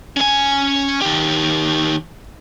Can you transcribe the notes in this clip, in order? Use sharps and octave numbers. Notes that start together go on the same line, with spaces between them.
C#4 G#5
D#3 G4